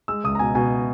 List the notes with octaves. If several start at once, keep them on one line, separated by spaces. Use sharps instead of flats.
G#3 E6
C#2 D#6
A#5
B2 G#5
B2 G#5